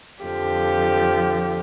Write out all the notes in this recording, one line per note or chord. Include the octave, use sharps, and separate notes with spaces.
F2 D3 F3 G4